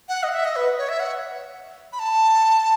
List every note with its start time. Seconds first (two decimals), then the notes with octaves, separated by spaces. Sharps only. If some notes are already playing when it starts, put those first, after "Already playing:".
0.09 F#5
0.23 D#5
0.29 F#5
0.33 E5
0.45 D#5
0.56 B4
0.78 C#5
0.89 E5
1.00 F#5
1.93 B5
1.99 A5